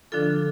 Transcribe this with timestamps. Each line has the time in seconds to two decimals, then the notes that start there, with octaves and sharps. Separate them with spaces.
0.12 D3 F3 D4 F4 A4